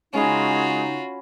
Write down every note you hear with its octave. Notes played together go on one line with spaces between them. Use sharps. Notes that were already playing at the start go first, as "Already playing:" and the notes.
C#3 G#3 C#4 D#4 F4 F#4 B5